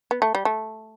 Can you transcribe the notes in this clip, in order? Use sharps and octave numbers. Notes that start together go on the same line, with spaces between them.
B3
A3
G3
A3